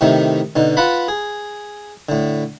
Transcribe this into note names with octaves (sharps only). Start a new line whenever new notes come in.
A2 C3 D#3 A3 D#4
B2 D3 D#4
F4 B4 F#5 A5 B5
G#4
A2 D3